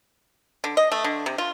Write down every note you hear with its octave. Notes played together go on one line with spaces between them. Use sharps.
D3
D#5
A3
D3
C3
F4